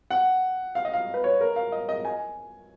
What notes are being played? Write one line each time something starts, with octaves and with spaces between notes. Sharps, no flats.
F#5
F5
D#5
F5
B4
C#5
A#4
F5
D#5
D#5
G#5